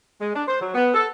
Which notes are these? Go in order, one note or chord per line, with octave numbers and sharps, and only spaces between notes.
G#3
D4
C5
F#3
B3
A4